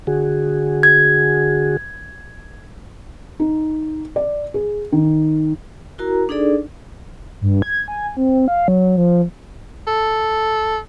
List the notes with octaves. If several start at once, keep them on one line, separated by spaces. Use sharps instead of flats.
D3 F#4 G#4
G#6
D#4
D5
G#4
D#3
E4 F#4 A#4 A#5
D4 D#4 G#4 A4 D5
G2
G#6
G#5
C4
F5
F#3
F3
A4